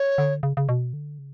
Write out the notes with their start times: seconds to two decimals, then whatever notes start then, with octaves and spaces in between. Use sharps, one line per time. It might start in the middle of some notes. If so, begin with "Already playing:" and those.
Already playing: C#5
0.18 D3
0.43 C#3
0.57 C#3
0.69 B2
0.93 D3
1.19 C#3